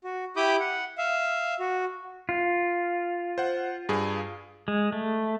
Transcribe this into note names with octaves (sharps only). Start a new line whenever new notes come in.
F#4
E4 G4 B5 D6 D#6 G6
F#5
E5 F5
F#4
F4
C5 F#5
G2 G#4
G#3
A3